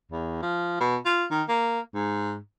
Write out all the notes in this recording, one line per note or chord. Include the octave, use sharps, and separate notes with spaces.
E2
F3
B2
F4
D#3
A#3
G#2